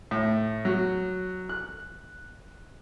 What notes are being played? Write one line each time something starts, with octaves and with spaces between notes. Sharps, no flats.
A2
F#3
F#6